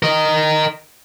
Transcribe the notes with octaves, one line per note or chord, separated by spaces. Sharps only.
A#4 D#5